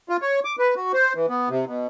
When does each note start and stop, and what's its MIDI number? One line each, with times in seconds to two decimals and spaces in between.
0.09 0.17 65
0.21 0.40 73
0.45 0.56 86
0.59 0.74 71
0.76 0.92 66
0.94 1.13 72
1.15 1.26 52
1.29 1.49 59
1.49 1.65 48
1.67 1.87 47